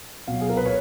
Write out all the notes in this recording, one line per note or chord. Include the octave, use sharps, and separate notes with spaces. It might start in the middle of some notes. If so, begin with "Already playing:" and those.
B2 F#3 F5
G#4
A#4
B4
C#5